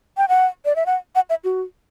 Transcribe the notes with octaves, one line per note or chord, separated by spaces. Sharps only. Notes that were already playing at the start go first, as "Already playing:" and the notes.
G5
F#5
D5
E5
F#5
F#5
E5
F#4